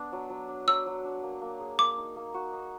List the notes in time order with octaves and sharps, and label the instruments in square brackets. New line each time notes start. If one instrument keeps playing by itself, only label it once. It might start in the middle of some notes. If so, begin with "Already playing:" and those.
Already playing: [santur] B3 D4
F#3
F#3
D4
[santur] F#3 [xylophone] E6
[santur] F#3
D4
A#3
A#3
G#4
[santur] A#3 [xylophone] D6
[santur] D#4
A#3
F#4
D#4